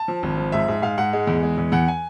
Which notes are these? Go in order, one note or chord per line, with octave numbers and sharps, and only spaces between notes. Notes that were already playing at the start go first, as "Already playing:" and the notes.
Already playing: A5
F3
G#1
F3
G#2 E5
G#2
G#2 F5
G#2 F#5
G#3
E2
G#3
E2
E2 F#5
G#5